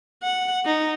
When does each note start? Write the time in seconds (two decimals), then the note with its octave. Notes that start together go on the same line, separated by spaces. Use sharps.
0.23 F#5
0.65 D#4